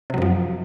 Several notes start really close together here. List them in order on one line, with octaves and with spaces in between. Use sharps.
C3 F#3 F#2 F3